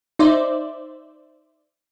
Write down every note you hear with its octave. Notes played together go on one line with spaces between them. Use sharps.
D#4 C5 D5 E5